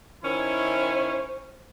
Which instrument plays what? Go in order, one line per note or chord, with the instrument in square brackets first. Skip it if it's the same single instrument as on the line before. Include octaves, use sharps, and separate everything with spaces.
[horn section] D#3 C#4 E4 [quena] C5